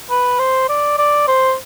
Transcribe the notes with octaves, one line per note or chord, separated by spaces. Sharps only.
B4
C5
D5
D5
C5